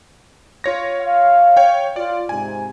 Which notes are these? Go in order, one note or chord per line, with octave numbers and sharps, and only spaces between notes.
F4 C#5 A#6
F5
C#5 G5
F4 D5
G#2 C3 G#5